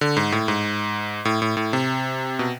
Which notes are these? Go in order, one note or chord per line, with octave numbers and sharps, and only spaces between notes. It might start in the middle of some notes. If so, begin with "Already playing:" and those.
D3
G#2
A2
G#2
A2
A2
A2
C3
B2